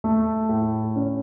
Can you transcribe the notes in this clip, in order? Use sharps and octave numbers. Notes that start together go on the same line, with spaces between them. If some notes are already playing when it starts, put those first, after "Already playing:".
A3
A2
C#4